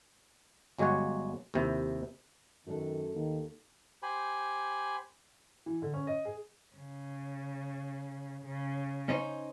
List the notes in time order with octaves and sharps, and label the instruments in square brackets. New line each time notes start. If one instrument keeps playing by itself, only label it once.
[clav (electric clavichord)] G1 F#3 G#3 G4 C#5 F#5
D#2 C3 E4
[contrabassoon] F#2 [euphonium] D#3 [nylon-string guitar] A3 D4 A4
[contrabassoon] D#2 [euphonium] D#3
[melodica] G4 C5 G#5 B5
[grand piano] E3
D3
C#4
D#5
G#4
[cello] C#3
C#3
[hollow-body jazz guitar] C#4 D#4 C5